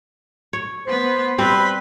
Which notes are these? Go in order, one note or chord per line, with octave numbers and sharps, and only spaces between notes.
C#5
B3 B4 C5
G3 C4 B4 B5 C6